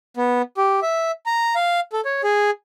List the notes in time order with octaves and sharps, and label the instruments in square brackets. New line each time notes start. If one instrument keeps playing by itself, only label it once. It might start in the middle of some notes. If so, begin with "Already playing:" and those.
[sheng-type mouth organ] B3
G4
E5
A#5
F5
A4
C#5
G#4